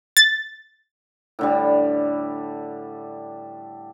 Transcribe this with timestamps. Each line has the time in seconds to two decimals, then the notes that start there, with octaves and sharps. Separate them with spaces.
0.17 A6
1.39 A2 D3 G3